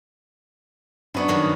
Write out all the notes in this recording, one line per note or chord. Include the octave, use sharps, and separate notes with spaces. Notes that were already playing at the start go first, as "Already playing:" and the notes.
F#2 B3 D4 E4 C#5
G2 D#3 F#3